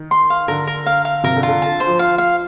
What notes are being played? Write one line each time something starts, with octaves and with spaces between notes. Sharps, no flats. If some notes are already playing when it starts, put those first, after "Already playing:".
Already playing: D#3
C6
F5
D3 A#4
A#4
F5
F5
C3 A#4
D3
F4
D3
A5
C5
F3
F5
F5